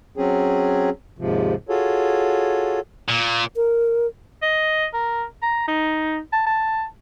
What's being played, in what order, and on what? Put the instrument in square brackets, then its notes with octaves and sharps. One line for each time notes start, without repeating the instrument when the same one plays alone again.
[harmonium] F#3 C4 C#4 G#4
D#2 G#2 C3 F3
F4 F#4 G#4 A4 C#5
[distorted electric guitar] A#2
[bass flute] A#4
[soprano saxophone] D#5
A#4
A#5
D#4
A5
A5